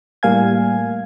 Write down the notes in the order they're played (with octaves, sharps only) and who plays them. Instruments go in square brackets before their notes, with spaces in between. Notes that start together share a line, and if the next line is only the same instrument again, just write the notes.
[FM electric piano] A2 G3 A#3 F5 G#5 G#6